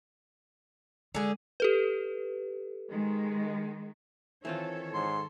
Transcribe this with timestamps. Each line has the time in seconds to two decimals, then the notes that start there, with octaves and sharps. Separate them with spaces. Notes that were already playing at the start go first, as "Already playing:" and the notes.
1.15 D3 G#3 G#4
1.60 G4 A4 B4
2.91 D#3 G#3
4.45 D#3 E3 C4 F4 A4 C#5
4.93 G#2 C6